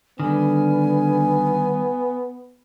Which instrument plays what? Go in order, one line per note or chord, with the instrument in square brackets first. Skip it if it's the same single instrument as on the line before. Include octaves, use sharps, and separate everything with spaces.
[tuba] D3 [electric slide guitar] D#3 G3 [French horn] B3 [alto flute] G#5